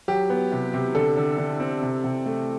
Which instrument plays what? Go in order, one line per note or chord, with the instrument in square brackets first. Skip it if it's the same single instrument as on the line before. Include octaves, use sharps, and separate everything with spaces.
[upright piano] F#3 G4
B3
C3
C3
D3 A4
D3
D3
C4
C3
C3
A3